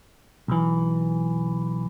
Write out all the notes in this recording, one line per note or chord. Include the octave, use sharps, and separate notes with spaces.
B1 E3